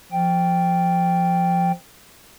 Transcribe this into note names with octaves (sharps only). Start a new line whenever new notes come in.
F3 G5